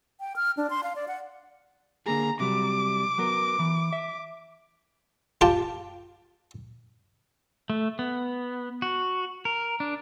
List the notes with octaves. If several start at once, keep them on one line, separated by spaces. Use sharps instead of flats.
G5
F6
D4
C6
F5
D5
F#5
D3 A#3 G#4 A#5
C3 F#3 G3 D6
F#3 B3 A#4
E3
E5
F4 G4 G5 A5
A3
B3
F#4
A#4
D4